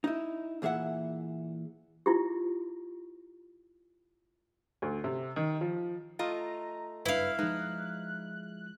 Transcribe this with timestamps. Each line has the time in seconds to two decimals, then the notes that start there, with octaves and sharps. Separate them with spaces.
0.04 D#4 E4
0.62 A#2 E3 G#4 E5 F#5
2.06 E4 F4 G4
4.82 D2
5.04 C3
5.36 D#3
5.61 F3
6.19 A3 F4 D#5 A#5
7.06 F#1 G2 D4 E4 B4 F5
7.39 F3 G#3 D#4 F#6